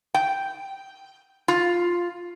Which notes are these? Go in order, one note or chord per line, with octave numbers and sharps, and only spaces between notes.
G5
F4